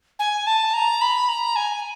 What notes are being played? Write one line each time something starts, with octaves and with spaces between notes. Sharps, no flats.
G#5
A5
A#5
B5
A#5
G#5